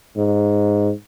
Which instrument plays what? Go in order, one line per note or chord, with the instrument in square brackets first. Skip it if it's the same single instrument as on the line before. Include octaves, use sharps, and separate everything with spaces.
[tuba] G#2